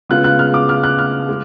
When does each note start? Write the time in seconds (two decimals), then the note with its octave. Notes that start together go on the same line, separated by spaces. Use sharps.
0.09 C#3 G#3 B3 F4 F#6
0.24 F#6
0.39 F6
0.54 D6
0.69 F6
0.84 F#6
0.99 F6
1.29 G#3